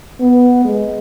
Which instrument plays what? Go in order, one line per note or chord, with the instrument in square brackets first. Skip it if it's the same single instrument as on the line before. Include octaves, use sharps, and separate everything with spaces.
[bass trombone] B3
G#3